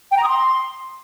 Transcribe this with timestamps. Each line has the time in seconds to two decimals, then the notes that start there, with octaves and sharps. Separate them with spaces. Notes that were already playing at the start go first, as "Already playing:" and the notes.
0.11 G5
0.17 A#5
0.23 D#6
0.28 C6